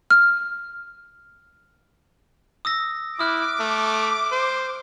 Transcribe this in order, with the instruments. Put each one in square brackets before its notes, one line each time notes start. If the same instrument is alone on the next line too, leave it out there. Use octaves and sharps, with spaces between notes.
[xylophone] F6
[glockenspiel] D#6 E6 A#6
[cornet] E4 [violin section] D6 [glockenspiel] D#6 F6 F#6
[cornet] A3
C5